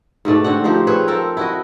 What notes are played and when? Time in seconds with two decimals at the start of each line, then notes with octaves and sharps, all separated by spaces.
0.25 G#2 B2 A3 D5
0.44 D3 C4 F#4 F#5
0.64 F3 D#4 G4 C5
0.87 C4 G#4 B4 C#5
1.08 C4 A4 A#4
1.37 E4 F#4 D#5